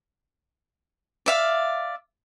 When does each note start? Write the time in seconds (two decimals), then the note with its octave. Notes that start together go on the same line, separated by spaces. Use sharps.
1.26 D5 E5 F5